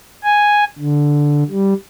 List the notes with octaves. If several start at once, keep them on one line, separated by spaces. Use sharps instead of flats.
G#5
D3
G3